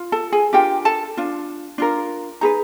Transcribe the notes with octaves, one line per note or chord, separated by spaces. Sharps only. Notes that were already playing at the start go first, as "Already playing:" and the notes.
Already playing: F4
A4 A5
G#4 G#5
D4 F4 G4 A#4 G5
A4 A5
D4 F4
D4 F4 A#4
D#4 G#4 B4 A#5